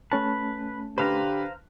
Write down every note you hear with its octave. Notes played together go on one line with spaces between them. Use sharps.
A3 C#4 B4 A5
D3 G4 B4 C5 F5 A#5